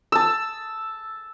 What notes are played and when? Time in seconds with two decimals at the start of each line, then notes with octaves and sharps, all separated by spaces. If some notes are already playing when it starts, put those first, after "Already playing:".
0.12 A5 E6